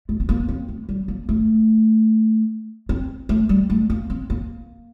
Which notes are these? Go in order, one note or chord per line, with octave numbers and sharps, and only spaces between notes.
A3
C4
A#3
C4
A3
G3
A#3
A3
C4
A3
G3
A3
A#3
C4
A#3